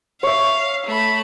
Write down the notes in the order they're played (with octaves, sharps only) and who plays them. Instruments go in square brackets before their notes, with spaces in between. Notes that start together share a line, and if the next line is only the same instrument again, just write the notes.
[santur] C#5 E5 [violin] F5
[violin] A3 B5